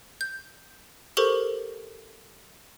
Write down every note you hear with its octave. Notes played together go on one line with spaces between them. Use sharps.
G6
G4 A4 A#4 C5 C#6